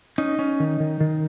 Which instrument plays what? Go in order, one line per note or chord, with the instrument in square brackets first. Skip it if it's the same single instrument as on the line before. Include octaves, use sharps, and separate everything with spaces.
[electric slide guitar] C#4 D#4
C#4
D#3
D#3
D#3